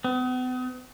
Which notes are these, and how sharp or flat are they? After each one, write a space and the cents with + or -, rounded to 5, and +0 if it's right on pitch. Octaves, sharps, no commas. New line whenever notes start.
B3 +40